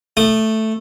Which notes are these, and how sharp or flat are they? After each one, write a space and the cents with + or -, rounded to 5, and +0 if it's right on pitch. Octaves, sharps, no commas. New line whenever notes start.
A3 +0 D#6 -35